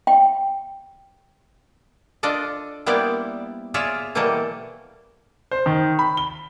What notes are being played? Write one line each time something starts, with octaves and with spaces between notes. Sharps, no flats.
G5
D4 F4 A4 D5 D#5
G3 A#3 B3 E4 C5 D5
F4 G#4 C#5 D5 E5
B2 E3 F#3 G3 A#3 A4
C5
D#3
B5
G7